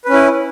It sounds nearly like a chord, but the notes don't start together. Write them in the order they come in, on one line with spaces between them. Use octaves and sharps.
B4 C#4 E4